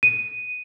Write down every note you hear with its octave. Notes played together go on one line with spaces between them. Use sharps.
D#7